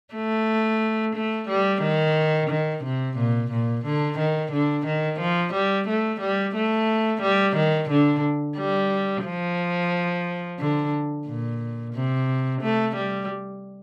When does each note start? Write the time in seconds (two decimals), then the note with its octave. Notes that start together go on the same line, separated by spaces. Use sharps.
0.14 A3
1.15 A3
1.48 G3
1.82 D#3
2.50 D#3
2.84 C3
3.17 A#2
3.51 A#2
3.85 D3
4.18 D#3
4.52 D3
4.86 D#3
5.20 F3
5.53 G3
5.88 A3
6.20 G3
6.55 A3
7.22 G3
7.56 D#3
7.90 D3
8.57 G3
9.24 F3
10.59 D3
11.27 A#2
11.94 C3
12.62 A3
12.95 G3